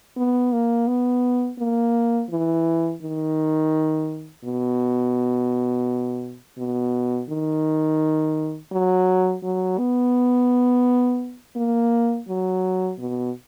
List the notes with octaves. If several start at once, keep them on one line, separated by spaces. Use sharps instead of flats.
B3
A#3
B3
A#3
E3
D#3
B2
B2
D#3
F#3
F#3
B3
A#3
F#3
B2